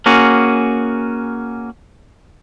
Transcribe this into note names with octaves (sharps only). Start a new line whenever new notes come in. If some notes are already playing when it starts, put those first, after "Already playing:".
A#3 C#4 F#4 G#4